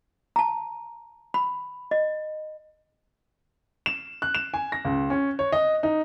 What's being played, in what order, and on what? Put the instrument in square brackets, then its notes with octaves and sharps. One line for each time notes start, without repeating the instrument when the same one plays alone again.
[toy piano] A5 A#5
B5
D#5
[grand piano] E7
F#6
E7
G#5
A#6
C#2
C#4
C#5
D#5
D#4